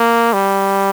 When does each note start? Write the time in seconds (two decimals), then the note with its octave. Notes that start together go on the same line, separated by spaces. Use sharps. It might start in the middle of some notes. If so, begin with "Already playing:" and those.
Already playing: A#3
0.33 G3